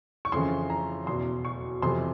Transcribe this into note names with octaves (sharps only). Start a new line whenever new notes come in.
C#6
F2 C#3 E3 C6
A#5
E2 B2 C6
C#6
F2 C3 E3 C6